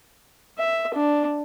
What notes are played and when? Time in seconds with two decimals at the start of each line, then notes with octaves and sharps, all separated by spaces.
0.58 E5
0.94 D4